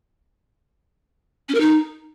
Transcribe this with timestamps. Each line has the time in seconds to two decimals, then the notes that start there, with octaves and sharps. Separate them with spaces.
1.49 C#4
1.55 A#4
1.61 D#4